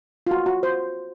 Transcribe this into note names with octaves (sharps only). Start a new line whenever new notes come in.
F4
F#4
F#4
C5